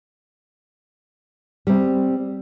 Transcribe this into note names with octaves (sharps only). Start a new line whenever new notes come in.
G3 C4